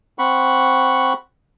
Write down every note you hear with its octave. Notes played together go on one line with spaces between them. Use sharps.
C4 F#5 B5 C#6